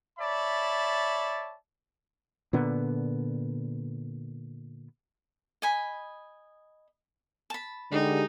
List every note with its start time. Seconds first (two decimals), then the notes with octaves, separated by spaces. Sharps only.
0.19 C#5 D5 E5 A5 B5
2.53 A#2 D3 B3
5.62 D#5 G#5 B5
7.50 A5 B5
7.91 D3 G#3 D#4 G4